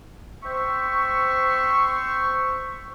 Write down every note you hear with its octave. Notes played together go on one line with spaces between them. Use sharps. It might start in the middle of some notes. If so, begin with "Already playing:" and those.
C4 C5 E5 C#6